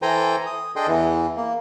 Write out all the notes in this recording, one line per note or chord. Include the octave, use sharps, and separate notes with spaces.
E3 A4 C5 G5 G#5 A#5
D#6
D4 G#4 A4 D#5 G5 C6
E2 E3
A#3